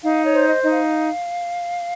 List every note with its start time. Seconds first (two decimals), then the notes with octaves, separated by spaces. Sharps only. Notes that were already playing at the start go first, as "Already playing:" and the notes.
0.03 D#4 F5
0.26 C#5
0.33 C5
0.48 D#5
0.63 D#4 D#5
0.70 F5